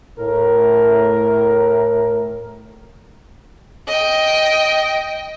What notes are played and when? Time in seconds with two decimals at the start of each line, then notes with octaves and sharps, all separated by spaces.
0.19 A2 A#4
3.87 D#5 G5